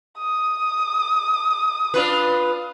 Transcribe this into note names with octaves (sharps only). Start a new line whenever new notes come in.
D#6
D4 F4 B4